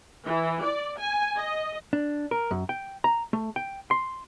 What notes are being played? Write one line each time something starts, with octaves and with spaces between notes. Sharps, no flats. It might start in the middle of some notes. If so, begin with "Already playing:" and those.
E3
D5
G#5
D#5
D4
A#4
F#2
G5
A#5
A3
G5
C6